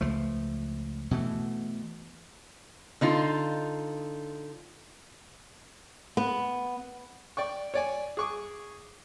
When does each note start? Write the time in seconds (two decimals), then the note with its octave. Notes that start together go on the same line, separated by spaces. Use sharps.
0.01 C#2 F3 A3
1.11 B2 E3 A3
3.01 D3 D#4 F4
6.17 B3
7.37 D5 G5 C#6
7.74 C#5 D5 G#5
8.17 G#4 C#6 D6